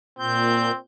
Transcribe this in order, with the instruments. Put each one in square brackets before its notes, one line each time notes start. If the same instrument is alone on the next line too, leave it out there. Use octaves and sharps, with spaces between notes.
[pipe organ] A#2 G6 [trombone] C4